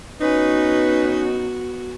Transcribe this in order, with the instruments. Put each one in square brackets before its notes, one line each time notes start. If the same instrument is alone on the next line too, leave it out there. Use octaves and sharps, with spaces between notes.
[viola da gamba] B3 F#4 [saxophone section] C#4 D#4 [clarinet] B4